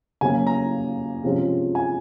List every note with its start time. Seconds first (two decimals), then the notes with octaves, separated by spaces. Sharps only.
0.21 C#3 F#3 A#3 C#4 G#5
0.47 A#5
1.23 C3 F3 G#3 C#4
1.75 G#5